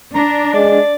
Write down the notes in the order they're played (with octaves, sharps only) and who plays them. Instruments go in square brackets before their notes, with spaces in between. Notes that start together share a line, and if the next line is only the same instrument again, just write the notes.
[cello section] D4 [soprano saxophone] A#5
[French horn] G#3 [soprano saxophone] D5